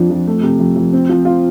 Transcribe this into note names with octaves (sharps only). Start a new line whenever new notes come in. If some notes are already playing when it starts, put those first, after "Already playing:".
Already playing: F2 F3 D4
F2
A3
C3
F2
F2
C4
F3
F4